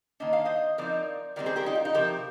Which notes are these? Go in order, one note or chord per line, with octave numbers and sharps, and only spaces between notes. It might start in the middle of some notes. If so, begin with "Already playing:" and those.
D#3 A#3 D4 D#5
F5
C5 D#5
F3 C4 D#4 A#4 D5
D#3 G3 C4 A#4 D5
G#4 C5
G4 A#4
D#4 G4
F4
D#4
C3 F3 C4 G4 A#4